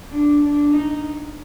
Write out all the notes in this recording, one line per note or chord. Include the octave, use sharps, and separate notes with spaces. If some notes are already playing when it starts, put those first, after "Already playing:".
D4
D4
D#4